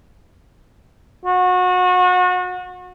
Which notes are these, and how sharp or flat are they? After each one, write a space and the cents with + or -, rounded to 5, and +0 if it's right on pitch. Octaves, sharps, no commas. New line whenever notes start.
F#4 -30